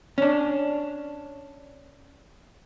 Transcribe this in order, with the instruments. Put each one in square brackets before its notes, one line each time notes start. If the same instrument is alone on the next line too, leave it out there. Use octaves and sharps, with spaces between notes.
[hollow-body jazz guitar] C#4 D4